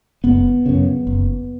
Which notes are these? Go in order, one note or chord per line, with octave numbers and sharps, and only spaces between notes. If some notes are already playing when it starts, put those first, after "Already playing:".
F#1 B3
F#2 C#3
F#1